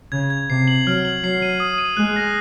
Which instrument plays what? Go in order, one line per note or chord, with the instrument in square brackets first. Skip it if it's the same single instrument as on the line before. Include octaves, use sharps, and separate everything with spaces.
[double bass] C#3 [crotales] G#6
[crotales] G#6
[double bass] C3 [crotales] C7
[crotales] F#7
[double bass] F#3 [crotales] F6
[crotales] F#7
[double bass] F#3 [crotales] C7
[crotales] D#7
D#6
D#7
[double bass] G#3 [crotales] F#6
[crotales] A#6